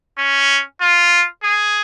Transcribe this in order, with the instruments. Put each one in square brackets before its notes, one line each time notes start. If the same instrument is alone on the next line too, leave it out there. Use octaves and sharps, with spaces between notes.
[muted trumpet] C#4
F4
G#4